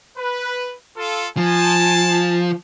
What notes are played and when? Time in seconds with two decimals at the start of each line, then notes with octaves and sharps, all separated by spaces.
0.17 B4
0.97 F4 A4
1.37 F3 G#5 A5